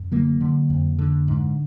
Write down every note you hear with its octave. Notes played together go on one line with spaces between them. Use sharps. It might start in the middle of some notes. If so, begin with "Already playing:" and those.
Already playing: F#2
D3 F#3 A#3
D3
F2
D3
G#2